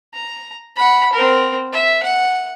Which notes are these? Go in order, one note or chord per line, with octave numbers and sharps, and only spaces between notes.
A#5
F#5 B5
C4 A#4
E5
F#5